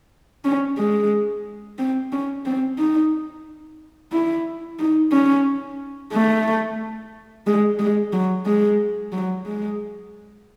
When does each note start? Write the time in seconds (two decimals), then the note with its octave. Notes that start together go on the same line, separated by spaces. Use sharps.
0.45 C#4
0.78 G#3
1.78 C4
2.12 C#4
2.46 C4
2.79 D#4
4.12 E4
4.79 D#4
5.12 C#4
6.13 A3
7.47 G#3
7.79 G#3
8.13 F#3
8.46 G#3
9.12 F#3
9.46 G#3